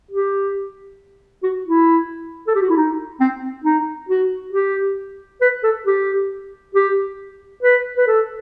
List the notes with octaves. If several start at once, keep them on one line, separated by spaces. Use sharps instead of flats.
G4
F#4
E4
A4
G4
F#4
E4
D#4
C4
D#4
F#4
G4
B4
A4
G4
G4
B4
B4
A4